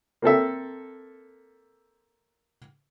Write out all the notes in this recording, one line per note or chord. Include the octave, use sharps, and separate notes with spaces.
A#3 C4 A4 E5